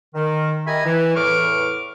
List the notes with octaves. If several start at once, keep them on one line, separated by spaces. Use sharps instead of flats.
D#3
G4 A#4 D#5 E5 G#5 B5
E3
E2 A2 B4 C#6 D6 F6